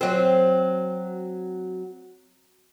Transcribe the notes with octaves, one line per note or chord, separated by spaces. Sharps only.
F#3 C4